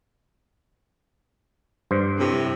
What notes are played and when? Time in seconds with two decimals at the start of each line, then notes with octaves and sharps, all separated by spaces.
1.91 G2 C5
2.19 A2 C3